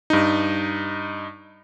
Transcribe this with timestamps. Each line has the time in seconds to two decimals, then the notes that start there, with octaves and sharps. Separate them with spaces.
0.10 G2 D#4